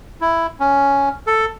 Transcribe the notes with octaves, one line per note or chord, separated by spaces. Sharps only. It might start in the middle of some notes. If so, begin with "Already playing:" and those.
E4
C#4
A4